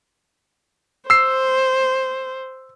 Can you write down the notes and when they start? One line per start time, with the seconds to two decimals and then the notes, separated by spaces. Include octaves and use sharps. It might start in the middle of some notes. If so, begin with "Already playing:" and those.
1.10 C5 E6 C7